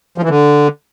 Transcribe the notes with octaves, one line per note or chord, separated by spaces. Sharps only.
F3
E3
D3